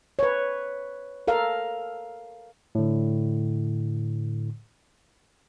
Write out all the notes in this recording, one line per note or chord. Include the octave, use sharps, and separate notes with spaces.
B4 C#5
A4 A#4 F5
A2 D3